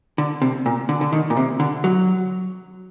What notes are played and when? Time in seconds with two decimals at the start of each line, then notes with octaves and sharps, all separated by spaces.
0.18 D3
0.42 C3
0.66 A#2
0.89 D3
1.01 D3
1.12 D#3
1.30 A#2
1.37 C3
1.60 D3
1.84 F#3